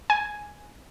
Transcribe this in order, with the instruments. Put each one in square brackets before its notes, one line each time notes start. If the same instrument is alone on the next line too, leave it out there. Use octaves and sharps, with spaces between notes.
[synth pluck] G#5